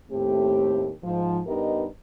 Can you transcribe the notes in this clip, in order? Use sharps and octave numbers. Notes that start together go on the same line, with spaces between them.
D#2 A2 A3 C4 G4
G#2 F3
G2 B3 D#4 G4 A#4 D#5